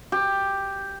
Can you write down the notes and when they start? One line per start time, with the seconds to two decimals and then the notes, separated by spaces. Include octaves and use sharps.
0.12 G4